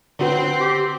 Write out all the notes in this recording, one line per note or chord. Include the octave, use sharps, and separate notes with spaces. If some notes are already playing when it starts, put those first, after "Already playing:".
D3 C4 F#4 B4
G4